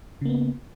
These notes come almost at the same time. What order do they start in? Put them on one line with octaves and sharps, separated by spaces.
C#3 A#3 B3